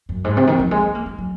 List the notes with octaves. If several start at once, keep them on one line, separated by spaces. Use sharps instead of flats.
F#2
G#2
C3
D#3
F3
G#3
C#4
A#3
G#3
F#3